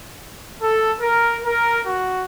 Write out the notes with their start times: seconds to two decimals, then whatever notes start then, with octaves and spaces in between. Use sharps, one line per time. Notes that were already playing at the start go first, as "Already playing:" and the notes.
0.61 A4
1.00 A#4
1.44 A#4
1.86 F#4